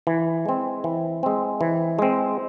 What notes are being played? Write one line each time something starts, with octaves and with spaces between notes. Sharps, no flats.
E3
G#3 C4
E3
G#3 C4
E3
G#3 C4